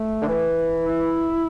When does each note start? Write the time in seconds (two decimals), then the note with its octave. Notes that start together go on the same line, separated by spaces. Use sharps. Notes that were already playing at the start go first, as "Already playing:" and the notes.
Already playing: A3
0.21 D3
0.26 E3
0.84 E4